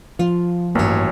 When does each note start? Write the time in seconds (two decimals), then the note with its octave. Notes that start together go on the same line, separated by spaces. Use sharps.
0.19 F3 F4
0.75 A1 G2 D#3 F#3 A#3